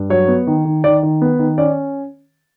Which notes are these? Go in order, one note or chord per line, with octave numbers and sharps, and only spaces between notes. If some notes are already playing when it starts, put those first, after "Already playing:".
Already playing: G2
F#3 C#5
B3
D#3
D#3
D#3 D5
D#3
B3
D#3
C#4 D5